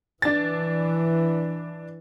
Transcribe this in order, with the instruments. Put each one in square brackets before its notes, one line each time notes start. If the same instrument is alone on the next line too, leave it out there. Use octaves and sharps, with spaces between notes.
[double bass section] E3 [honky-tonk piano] D4 A6